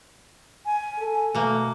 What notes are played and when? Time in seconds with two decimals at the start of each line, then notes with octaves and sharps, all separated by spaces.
0.66 G#5
0.99 A4
1.34 B2 A3 A#3